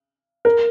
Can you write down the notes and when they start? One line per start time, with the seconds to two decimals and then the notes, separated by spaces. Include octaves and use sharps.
0.45 A#4